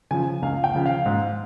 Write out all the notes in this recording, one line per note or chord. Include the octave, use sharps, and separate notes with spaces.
C#3 F3 G#5
C#2 F5
G5
C#3 F3
F5
G#2